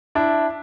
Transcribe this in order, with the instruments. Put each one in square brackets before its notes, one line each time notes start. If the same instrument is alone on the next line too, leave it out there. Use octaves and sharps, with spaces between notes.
[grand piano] D4 E4